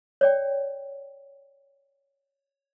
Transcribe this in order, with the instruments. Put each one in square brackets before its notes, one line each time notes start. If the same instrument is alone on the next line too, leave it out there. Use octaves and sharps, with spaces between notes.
[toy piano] C#5 D5 G5